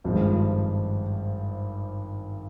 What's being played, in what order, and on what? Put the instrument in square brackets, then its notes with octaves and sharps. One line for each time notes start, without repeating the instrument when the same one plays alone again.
[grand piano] G#1 G2 F3 G#3